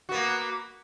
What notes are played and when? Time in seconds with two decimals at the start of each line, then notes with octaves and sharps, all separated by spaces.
0.09 F#4
0.12 B3
0.15 A#3